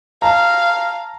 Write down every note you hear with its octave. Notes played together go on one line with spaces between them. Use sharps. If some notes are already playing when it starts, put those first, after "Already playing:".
F5 A5 A#5